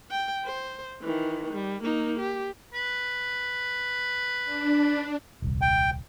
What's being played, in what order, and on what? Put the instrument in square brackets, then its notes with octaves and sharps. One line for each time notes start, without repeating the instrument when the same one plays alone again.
[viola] G5
C5
D#3 E3
G3
A#3 D#4
G4
[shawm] B4
[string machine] D4
[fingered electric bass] D#1 C2
[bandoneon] G5